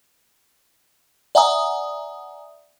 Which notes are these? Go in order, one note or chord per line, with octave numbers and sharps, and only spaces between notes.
D5 E5 F#5 G#5 A#5 D#6